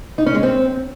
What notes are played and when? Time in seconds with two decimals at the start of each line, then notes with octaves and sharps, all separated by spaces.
0.18 D#4
0.26 C#4
0.35 G#3
0.43 C4